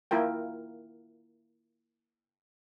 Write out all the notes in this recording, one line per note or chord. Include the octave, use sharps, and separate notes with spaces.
A#3 E4 F4 A#4 G5